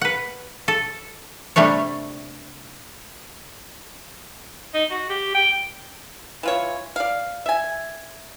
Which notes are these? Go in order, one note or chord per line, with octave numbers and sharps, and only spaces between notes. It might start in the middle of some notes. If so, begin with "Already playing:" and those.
B4 F#5
A4
C3 G3 A3 D4 C#5
D#4
F#4
G4
G5
E3 F4 C#5
D5 F5
E5 G#5